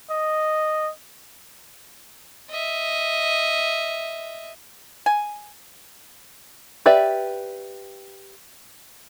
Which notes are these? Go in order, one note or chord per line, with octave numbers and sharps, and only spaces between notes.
D#5
D#5 E5
G#5
G4 B4 D5 E5